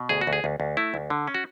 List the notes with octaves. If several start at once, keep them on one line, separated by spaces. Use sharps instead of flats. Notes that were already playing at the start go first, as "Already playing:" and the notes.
Already playing: B2
D2 G#4
F#4
D2
G#4
D2
D2
A3 E4
D2
D3
C#4
F#4